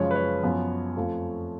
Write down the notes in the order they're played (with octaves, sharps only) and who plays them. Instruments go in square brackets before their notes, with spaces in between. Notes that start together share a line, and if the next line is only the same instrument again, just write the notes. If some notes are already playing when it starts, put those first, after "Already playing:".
Already playing: [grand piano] F#2 C#3 F3 G#3 C#5
B4
C#5
F#2 F3 B3
F2 F3 A3